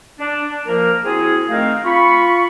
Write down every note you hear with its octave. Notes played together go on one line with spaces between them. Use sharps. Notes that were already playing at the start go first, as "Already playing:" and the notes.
D4
F3 A#3 A#4
C4 E4 F#4 G#4
D#3 A3 C4 A#4 F5
F4 B5 C#6